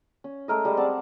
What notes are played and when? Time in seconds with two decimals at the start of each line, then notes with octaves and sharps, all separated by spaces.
0.24 C#4
0.48 G#3 A3 A#4 D#5
0.65 G3 G#3 C6
0.77 C4 D5 F#5 A5